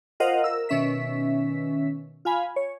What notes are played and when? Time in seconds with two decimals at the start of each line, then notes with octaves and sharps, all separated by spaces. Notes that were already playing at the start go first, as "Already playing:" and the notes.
0.20 F4 A#4 C5 D#5 F5 F#5
0.44 A#4 E6
0.69 B2 D#3 C#4 E5 B6
2.25 F4 F5 G#5 B5
2.56 C#5